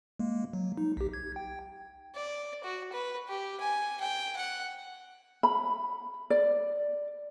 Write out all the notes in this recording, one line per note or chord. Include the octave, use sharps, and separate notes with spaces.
G#3 A#3
F#3
D#4
B1 G4
G#6
G5
D5
F#4
B4
G4
G#5
G5
F#5
B5
D5